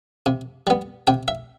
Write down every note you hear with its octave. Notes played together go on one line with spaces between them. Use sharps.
C3
G3 B3
C3 G5
E5